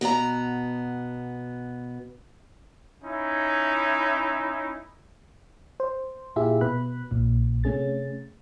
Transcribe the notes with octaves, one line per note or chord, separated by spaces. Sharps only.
B2 B3 D5 A#5
C#4 D#4 E4
C5
A#2 E4 F4 G4 G#4 E5
B2 B4 B5 F#6
A#1 A#2
C3 A3 C#4 G#4 A6